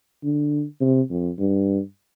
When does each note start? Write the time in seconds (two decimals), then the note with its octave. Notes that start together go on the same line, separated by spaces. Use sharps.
0.23 D3
0.81 C3
1.10 F2
1.39 G2